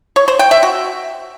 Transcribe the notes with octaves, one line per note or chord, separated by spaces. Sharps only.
C#5
C5
G5
E5
F#4